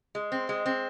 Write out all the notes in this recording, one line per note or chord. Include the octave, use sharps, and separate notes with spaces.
G#3
C4
G#3
C4